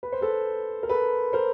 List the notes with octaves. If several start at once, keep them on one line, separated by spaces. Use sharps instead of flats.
B4
C5
A4 B4
A#4
A4 B4
A#4 C5